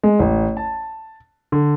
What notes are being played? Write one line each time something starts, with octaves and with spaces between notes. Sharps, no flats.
G#3
A1
A5
D3